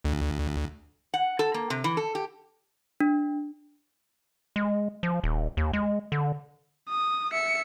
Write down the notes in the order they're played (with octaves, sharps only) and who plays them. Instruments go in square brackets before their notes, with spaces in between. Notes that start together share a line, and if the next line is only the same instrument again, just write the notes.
[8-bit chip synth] D2
[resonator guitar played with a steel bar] F#5
A4
A#3
C3
E3
A4
G4
[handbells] D4
[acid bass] G#3
F3
D#1
D#2
G#3
D3
[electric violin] D#6
E5 C#7